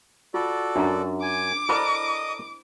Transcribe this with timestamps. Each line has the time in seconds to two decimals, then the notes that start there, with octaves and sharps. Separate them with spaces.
0.34 F4 F#4 A4 D5
0.76 F#2 D4 A#5
1.22 G#5 D6
1.69 E4 A4 A#4 C5 D5 D#5 B5 D#6